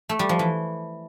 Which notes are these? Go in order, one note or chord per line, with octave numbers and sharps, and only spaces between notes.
A3
G3
F3
E3